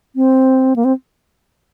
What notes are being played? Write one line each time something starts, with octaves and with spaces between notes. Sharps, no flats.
C4
A#3
C4